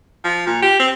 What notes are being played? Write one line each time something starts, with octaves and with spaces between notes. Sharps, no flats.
F3
A#2
G4
C4